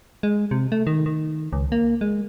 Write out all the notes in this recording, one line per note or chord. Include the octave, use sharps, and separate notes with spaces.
G#3
C3
A3
D#3
D#3
C#2
A#3
G#3